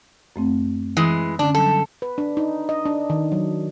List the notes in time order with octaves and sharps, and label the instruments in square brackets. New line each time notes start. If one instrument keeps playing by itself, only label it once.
[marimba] F#2 A3 C4
[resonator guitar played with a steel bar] E3 G#3
[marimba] D3 C#4 [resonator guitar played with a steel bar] D4
[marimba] F#3 G3 [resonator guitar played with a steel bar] A4
[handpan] B4
D4
D#4
D#5
D4
D#3
F#3